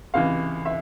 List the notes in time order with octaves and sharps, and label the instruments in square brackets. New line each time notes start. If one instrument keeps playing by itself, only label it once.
[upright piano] C#2 C3 E3 F5
E5